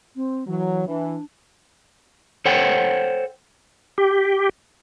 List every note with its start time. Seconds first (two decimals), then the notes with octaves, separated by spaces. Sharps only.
0.16 C4
0.47 E3 F#3
0.88 E3 D4
2.46 A4 C5 C#5 F#5 G5
3.98 G4